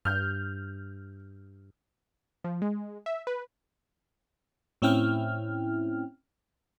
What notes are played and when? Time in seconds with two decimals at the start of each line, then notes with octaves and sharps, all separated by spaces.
0.05 G2 F6 G6
2.44 F3
2.62 G#3
3.06 E5
3.27 B4
4.82 A2 C4 C#4 E4 G5 F6